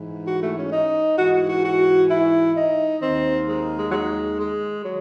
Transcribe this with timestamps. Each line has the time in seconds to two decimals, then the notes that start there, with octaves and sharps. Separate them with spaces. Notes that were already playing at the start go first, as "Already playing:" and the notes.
Already playing: G#2 E3
0.26 F#4
0.42 A3
0.57 C#4
0.73 D#4
1.17 G#2 E3 F#4
1.33 F#4
1.49 F#4
1.64 F#4
2.09 E4
2.56 D#4
3.01 D#2 D#3 C4
3.47 G#3
3.78 G#3
3.90 F#3
3.93 G#3
4.39 G#3
4.85 D#3 F#3